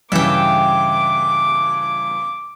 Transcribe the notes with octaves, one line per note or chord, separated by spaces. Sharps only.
G2 C#3 E3 E5 G5 D6